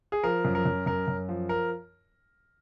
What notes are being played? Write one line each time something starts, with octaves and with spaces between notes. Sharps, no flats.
G#4
F3 A#4
F#2
A#4
F#2
F#2 A#4
F#2
F3
A#4